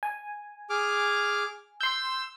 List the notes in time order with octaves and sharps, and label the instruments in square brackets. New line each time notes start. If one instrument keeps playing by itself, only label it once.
[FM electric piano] G#5
[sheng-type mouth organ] G#4 D6 F6
[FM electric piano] C6 G6 [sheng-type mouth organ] E6